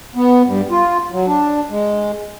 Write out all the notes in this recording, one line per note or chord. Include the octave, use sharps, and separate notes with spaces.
B3
G2
F4
F#3
D4
G#3